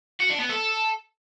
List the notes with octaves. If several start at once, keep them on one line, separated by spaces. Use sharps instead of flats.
F#4
D4
B3
A4